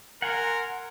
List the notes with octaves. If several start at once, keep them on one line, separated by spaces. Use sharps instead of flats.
A#4 F#5 G#5 C6